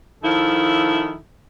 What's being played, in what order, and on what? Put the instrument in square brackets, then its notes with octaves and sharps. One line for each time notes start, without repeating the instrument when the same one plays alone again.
[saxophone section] D#3 F3 E4 A4